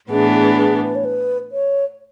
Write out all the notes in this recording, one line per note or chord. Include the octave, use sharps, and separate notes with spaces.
A2 E3 B3 D4 G#4
G#4
G#4
B4
C#5
B4
C#5